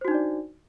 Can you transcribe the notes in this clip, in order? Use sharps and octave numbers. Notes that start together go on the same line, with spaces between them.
D4 D#4 F#4 C5 D5